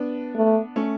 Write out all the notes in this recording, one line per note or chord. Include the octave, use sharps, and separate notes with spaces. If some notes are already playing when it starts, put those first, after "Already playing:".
Already playing: B3 D4
A3
A3 C#4